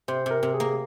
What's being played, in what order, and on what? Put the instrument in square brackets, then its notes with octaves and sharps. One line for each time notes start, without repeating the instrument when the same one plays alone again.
[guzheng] C3 [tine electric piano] C5
[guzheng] C3 [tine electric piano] A#4
[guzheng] C3
[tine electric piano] G#4
[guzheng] A#3